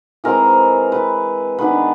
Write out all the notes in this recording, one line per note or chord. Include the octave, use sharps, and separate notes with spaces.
E3 G#3 C4 A#4
B4
D#3 G#3 B3 D4 B4